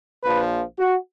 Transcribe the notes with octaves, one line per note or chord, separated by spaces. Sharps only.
A#1 A#2 F3 B4
F#4